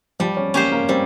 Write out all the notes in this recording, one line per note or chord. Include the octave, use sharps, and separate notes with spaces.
F3 G3
C#4
A#3 C#4 G4 C5
A#3
G3 C4